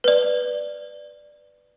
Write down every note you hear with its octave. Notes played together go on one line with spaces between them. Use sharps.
B4 D5